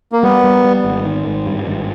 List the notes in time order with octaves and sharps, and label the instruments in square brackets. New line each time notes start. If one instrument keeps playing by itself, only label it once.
[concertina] A#3
[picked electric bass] G3 [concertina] B3
[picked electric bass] G3
G3
G#1
D#3
G#1
G2
G#1